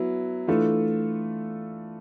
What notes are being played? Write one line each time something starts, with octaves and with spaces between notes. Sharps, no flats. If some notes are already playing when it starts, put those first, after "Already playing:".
Already playing: F#3 B3 E4
E3 A3 D4 F4 A4